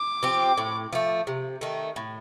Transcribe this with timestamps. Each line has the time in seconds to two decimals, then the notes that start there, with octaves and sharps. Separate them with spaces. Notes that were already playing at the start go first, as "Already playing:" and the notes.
Already playing: D6
0.23 F3 C4 G4
0.58 A2
0.93 F3 A3
1.27 C3
1.61 D#3 A3
1.96 A2